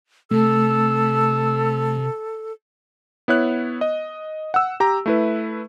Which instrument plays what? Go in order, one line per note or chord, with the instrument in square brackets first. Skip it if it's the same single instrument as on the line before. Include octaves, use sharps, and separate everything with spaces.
[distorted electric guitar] C3 [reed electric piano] A3 [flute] A4 [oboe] E6
[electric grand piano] B3 E4 C#5 F#6
D#5
F#5 E6
G4 A#5
A3 E4 B4